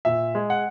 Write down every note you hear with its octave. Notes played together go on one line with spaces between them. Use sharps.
A#2 E5
G#3
F#5